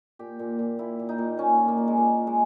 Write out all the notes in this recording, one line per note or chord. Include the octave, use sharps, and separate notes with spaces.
A#2 G4
A#2
A#2
A#2 E4
A#2
D#4
A#2
A#2 C#4
A#2
A#3
A#2
G#3
A#2 A#3
A#2
G#3